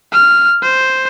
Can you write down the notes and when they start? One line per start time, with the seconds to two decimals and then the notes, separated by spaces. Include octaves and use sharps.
0.12 F6
0.62 C5